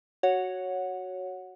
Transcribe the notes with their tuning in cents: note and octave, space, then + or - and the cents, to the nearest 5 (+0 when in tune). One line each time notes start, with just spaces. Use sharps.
F#4 +5 C#5 +0 F#5 -15